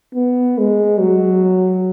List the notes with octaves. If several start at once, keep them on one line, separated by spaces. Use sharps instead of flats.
B3
G#3
F#3